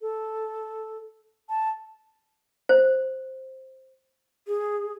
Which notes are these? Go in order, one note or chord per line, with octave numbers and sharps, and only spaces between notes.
A4
A5
C5
G#4